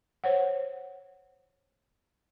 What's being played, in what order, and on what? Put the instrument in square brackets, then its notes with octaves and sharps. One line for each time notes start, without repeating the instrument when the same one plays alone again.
[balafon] C5 C#5 F#5